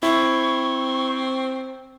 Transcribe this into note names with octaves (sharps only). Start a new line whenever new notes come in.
C4 E4 C#6